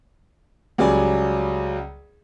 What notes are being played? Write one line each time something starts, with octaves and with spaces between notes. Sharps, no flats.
C#2 C#3 F#3 G3 D5 G#5